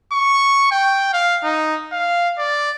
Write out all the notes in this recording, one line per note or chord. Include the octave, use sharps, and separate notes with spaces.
C#6
G5
F5
D#4
F5
D5